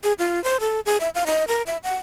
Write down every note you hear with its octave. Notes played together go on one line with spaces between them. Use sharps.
G#4
F4
C5
A4
G#4
E5
F5
D#5
A#4
E5
F#5